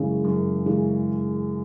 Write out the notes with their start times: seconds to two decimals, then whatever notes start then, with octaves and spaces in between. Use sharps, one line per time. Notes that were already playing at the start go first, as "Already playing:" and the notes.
Already playing: F#2 C#3 E3 G#3
0.24 F#2
0.66 C#3 E3 G#3